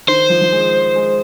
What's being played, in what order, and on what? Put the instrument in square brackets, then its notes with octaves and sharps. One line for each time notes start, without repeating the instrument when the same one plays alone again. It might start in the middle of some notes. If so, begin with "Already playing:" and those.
[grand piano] D#3 [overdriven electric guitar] C5
[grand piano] F3
F3
G#3
G#3